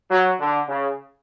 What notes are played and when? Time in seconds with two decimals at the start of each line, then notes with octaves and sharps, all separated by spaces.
0.11 F#3
0.40 D3
0.68 C#3